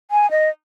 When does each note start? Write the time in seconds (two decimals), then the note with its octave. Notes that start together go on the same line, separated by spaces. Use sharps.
0.11 G#5
0.31 D#5